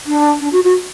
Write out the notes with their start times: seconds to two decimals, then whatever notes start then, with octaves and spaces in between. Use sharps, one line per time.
0.06 D4
0.41 D4
0.52 F#4
0.64 F#4